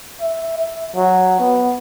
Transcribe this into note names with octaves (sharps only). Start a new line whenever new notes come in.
E5
E5
F#3
B3